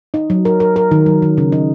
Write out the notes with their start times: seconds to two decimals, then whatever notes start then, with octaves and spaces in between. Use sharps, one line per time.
0.14 D#4
0.30 F#3
0.45 A#4
0.60 A#4
0.76 A#4
0.91 D#3
1.06 F#3
1.22 D#3
1.38 C#3
1.52 D#4